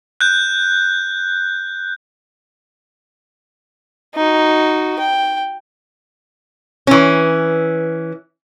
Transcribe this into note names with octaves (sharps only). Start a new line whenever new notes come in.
F#6 G6
D#4 F#4
G5
E3 C#4